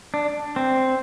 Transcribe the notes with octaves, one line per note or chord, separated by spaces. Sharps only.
D4
C4